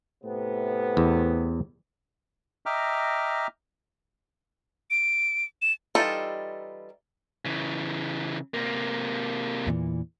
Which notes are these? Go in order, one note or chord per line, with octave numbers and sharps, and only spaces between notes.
A2 C3 B3
E2
D#5 E5 G5 A#5 D6 F6
D7
E7
E3 G3 D#4 F4 A4
C#3 E3
C3 A#3
E2 A#2 E3